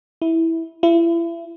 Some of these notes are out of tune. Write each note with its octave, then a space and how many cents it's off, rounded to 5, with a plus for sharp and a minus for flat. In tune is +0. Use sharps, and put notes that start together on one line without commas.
E4 -10
E4 +35